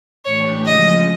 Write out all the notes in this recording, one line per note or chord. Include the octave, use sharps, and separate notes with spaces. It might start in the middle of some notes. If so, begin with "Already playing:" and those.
A2 E3 A3 D4 G4 C#5
C#3 F3 G#3 C#4 D#5